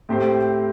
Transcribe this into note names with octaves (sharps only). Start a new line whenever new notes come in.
A2 A3 C4 G4 C5